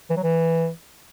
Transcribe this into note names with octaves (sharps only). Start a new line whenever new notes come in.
E3
F#3
E3